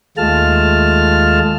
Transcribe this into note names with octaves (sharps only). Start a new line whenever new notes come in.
D#2 G#3 A3 F4 A5 F6